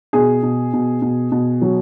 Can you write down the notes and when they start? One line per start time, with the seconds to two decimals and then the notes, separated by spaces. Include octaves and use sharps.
0.13 B2 G#4
0.43 B2
0.73 B2
1.02 B2
1.32 B2
1.62 F#3